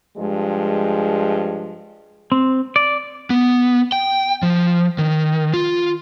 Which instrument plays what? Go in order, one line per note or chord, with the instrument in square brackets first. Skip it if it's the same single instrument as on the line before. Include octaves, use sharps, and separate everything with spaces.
[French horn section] G2 F3 G#3
[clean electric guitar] C4
D5
[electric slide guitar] B3
G5
F3
D#3
F4